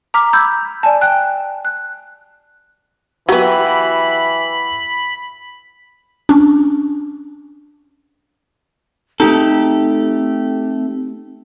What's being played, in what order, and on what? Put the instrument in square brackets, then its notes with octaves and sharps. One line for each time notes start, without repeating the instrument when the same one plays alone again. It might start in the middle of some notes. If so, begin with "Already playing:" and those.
[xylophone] A#5 D6 F6 B6
B5 E6 G6 G#6
D5 G#5 A5
G5 F#6
F#6
[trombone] E3 [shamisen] F#3 B3 [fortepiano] F#4 G4 [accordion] B5
[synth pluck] C#4 D4
[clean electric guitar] A3 G4 A4 [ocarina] C4 [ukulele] D#4